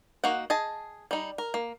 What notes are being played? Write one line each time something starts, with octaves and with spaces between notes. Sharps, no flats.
A#3 D#4 F#4 F#5
G#4 D#5 A5
G3 D#4
A#4
A#3